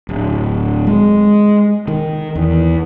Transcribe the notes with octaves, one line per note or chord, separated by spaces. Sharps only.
D1
G#3
D#3
E2